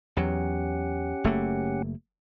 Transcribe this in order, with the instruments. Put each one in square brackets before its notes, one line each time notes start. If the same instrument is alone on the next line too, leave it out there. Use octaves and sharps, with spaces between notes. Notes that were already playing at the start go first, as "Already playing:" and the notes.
[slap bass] E2 F#3 [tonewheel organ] C#4 G4 F#5
[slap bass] F#1 A3 A#3